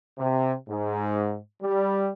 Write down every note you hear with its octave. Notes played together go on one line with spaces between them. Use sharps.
C3
G#2
G3